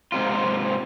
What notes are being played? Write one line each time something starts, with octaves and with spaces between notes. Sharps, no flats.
G#2 C3 F4